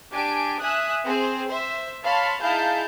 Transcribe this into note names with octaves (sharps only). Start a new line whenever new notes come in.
D4 G4 G#5 D7
E5 G#5 D#6 F#6
C4 G#4 C5
C5 E5
C#5 F5 A5 B5 C6
D#4 E4 G#4 F5 A5 G6